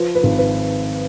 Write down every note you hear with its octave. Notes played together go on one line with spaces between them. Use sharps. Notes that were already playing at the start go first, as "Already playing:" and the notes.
Already playing: F3 B4
B4
G#1
B4